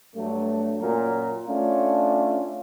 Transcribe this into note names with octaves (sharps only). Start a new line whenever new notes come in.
G2 F#3 A3
F#2 A#2 F#3 A#4
A3 C#4 D4 F4